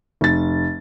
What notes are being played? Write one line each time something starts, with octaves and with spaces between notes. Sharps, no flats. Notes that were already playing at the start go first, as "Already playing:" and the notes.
F1 A6